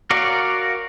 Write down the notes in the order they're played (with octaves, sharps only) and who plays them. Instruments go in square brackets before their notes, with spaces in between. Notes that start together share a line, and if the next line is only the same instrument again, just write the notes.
[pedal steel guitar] F#4 A#4 C#5 D5 F5